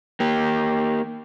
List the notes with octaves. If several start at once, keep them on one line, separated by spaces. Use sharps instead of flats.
A#3 G4